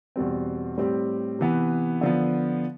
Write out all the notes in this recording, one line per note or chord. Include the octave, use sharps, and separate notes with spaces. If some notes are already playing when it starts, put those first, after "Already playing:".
E2 B2 G3 C4
A2 G3 C4 G4
C3 E3 B3
D3 F3 B3